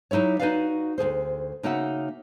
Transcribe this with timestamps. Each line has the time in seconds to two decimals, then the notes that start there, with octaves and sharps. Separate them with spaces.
0.11 F#3 D#4 E4 G4 C#5
0.39 D#4 E4 F#4 B4 D5 F5
0.98 D2 E3 G#4 C5
1.63 C#3 A#3 D#4 F#4 E5 F#5